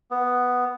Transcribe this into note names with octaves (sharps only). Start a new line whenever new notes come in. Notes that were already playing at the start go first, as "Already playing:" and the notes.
B3